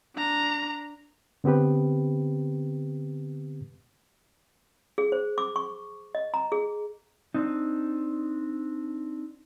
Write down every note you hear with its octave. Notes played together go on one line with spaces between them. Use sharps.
D4 A#5
D3 B3 C4 G4 B4
G#4
C5
D6
C#6
D#5
A#5
G#4
C4 D4 D#4